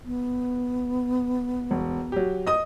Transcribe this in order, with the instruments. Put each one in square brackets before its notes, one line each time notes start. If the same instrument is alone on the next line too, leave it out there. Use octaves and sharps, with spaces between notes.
[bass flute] B3
[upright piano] E1
F#3 G4
D#5 D#6